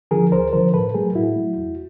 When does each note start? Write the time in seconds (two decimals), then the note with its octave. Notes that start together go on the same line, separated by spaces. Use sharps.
0.11 D3 F3 G#4 A#4
0.32 D2 A#4 C5
0.53 D3 F3 A#4 C5
0.73 A2 A4 B4
0.94 F#3 A3 G#4 A#4
1.15 A2 E4 F#4
1.36 F#3 A3
1.57 E2